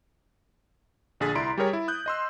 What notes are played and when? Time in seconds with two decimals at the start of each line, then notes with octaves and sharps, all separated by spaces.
1.20 A#1 D3 G#4 A6 B6
1.35 C2 E4 D5 A#5 C6 D7
1.58 G3 G4 G#4 A#4 C#5
1.73 E4
1.88 D#6 F#6 G6
2.06 D#5 C6 E6